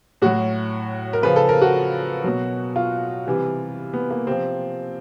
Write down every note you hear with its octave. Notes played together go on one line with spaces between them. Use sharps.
A2 F#3 F#4
A#4
C#3 F3 B4
A4
A#4
F#4
B2 F#3
F4
C3 E3 G3
B3
A#3
C3 F3 C4